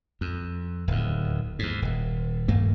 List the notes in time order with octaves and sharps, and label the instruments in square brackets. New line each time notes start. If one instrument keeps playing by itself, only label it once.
[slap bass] F2
D1 D#2
D#2 G#2
D#1
D#1 G2 A3 A#3